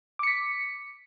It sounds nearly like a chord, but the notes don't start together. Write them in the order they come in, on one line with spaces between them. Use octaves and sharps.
D6 C#7 B6